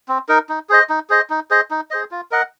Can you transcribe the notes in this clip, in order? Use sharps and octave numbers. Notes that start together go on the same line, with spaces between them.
C4
D#4 A#4
D#4
G#4 C5 D#5
D#4
G#4 C5 D#5
D#4
G#4 C5 D#5
D#4
G#4 C5 D#5
F4
A#4 D#5 F#5